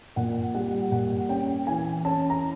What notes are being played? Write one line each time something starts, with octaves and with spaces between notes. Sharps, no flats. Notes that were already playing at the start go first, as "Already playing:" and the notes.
A#2 F#5
G3 F#5
A#2 F#5
C#4 G5
E3 G#5
C#4 A5
A#5